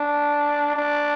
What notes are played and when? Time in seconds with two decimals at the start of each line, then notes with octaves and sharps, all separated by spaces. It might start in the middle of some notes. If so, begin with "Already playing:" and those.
Already playing: D4
0.76 D4